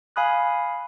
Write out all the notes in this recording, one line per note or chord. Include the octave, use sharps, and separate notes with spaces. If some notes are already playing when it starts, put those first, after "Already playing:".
F5 G#5 B5 D#6 F#6